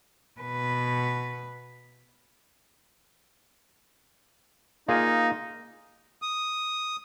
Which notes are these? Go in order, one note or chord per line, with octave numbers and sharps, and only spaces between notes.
B2 B4
A#3 D#4 F4 G#4
D#6